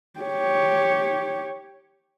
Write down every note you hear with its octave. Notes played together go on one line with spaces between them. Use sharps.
G4 C#5